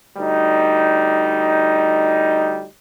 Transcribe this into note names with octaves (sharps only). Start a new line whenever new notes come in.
D2 G3 D#4